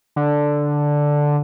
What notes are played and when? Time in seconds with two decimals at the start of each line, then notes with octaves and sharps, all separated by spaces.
0.16 D3